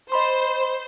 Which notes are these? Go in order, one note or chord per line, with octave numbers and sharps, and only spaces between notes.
C5 D#5 B5 C6